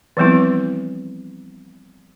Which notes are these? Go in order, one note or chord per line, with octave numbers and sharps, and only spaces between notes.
E3 F3 G3 B3 C4 E4